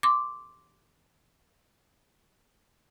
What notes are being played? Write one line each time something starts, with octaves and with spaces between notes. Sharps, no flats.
C6 D6